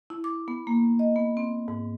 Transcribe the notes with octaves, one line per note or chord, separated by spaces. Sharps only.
E4
D6
B3
A#3
D#5
B3
C4
G#2